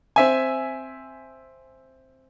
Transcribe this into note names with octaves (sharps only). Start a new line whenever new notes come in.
C4 E5 G#5